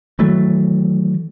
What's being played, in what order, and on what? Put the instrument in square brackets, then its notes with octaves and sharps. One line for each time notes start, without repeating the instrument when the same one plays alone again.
[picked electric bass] D#3 E3 F#3 A3